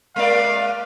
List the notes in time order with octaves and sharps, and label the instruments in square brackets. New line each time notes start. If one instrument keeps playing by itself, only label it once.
[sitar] G#3 A#3 D5 [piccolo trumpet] F5